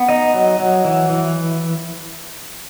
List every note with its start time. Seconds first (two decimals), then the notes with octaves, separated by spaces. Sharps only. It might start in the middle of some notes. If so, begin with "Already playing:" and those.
Already playing: B3
0.09 D#4 D#5
0.34 F#3
0.59 F#3
0.85 E3
1.10 E3